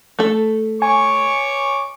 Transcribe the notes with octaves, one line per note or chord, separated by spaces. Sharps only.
A3 A4
C#5 G#5 C#6 D6